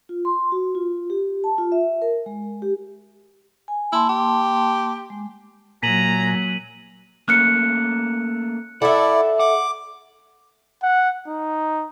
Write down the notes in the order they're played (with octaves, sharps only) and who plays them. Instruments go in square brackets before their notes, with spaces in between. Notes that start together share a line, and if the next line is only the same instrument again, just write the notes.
[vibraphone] F4
C6
F#4
F4
G4
A5
F4
E5
A#4
G#3
G4
G#5
[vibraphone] A#3 A5 C6 [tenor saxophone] E4
[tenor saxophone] G4
[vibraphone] G#3
[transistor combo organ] A#2 G#5 [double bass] F#3 A#3 [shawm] A#5 [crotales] B6 D#7 F#7
[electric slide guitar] A3 A#3 C#4 [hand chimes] F6 F#6 C#7
[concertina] E4 D5 [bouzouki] A4 E5 [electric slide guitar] F#5
[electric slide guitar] F#5 [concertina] D6
[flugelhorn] F#5
D#4